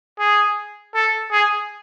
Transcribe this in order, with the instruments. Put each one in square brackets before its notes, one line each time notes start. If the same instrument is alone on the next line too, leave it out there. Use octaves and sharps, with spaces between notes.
[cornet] G#4
A4
G#4